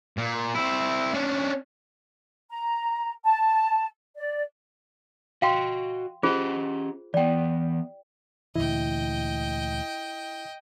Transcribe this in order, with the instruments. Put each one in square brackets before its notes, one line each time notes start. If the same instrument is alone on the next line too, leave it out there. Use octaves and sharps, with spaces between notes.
[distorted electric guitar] A#2
C4 E4
C#4 D4
[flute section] A#5
A5
D5
[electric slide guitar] F#4 D#5 [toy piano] F5 G5 C6
[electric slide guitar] C#4 G4 D#5 [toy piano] F4 G#4 C5
[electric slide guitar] E3 B3 [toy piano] D5 G5
[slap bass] D2 A#2 E3 [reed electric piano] E4 [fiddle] D#5 G5